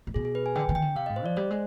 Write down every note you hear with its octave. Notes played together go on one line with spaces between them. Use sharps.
G#2
B2 G#4
G#4
B4
G#5
D3 G5
D3
D#3 G5
D3
C3 F5
G#2 D#5
C5
F3 D5
G3 C5
G#3